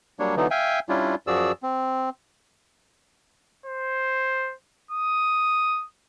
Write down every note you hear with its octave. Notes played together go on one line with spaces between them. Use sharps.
F#3 G3 A#3 D4 C#5
D3 E3 F#3 B3 D#4
E5 F5 G5 G#5
G3 C#4 D4 E4 F4
F#2 F3 F#4 G#4 D5 E6
C4
C5
D#6